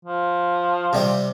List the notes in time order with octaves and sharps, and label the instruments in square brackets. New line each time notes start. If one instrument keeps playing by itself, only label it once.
[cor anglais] F3
[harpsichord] C3 G3 G4